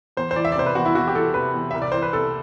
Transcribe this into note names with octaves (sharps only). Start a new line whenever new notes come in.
E2 C5
C5
E3 D5
E5
D5
C3 C5
B4
E2 F#4
E4
E2 F#4
G4
E3 A4
C3 B4
E2
C2 E5
D5
E3 C5
B4
C3 A4